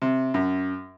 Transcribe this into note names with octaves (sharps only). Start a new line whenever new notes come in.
C3
F#2